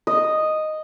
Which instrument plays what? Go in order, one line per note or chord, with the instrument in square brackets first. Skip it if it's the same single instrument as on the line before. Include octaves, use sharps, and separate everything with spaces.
[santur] D#5